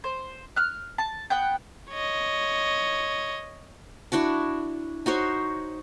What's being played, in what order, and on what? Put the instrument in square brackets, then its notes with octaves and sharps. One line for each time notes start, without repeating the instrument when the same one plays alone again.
[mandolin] C5
F6 F#6
A5
B3 F#5 G5
[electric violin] C#5 D#5
[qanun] D4 E4 F#4 A5
D#4 F#4 C5 C#5